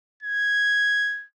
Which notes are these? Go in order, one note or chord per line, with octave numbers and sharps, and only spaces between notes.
G#6